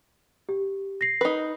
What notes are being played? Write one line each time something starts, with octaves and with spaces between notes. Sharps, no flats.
G4
A#6 C7
D#4 B4